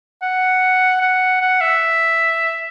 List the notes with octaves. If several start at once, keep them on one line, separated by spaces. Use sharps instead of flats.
F#5
F#5
F#5
E5